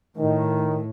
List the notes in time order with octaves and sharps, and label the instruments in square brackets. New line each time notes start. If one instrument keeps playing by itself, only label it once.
[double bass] A2 [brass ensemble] D#3